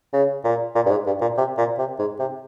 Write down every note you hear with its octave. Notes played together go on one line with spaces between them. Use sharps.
C#3
A#2
A#2
G2
G#2
G2
A#2
C3
A#2
C3
G#2
C3